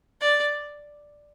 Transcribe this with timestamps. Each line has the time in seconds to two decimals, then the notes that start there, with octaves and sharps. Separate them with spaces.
0.21 D5